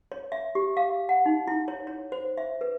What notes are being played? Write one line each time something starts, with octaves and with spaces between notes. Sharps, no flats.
C#5
E5
G4
F5
F#5
D#4
E4
C#5
C#5
C5
E5
B4